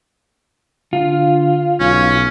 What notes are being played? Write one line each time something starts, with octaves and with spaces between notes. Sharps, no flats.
D3 F4
B1 C#4